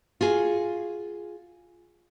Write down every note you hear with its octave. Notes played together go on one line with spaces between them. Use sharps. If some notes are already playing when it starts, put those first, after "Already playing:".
F4 F#4 G#4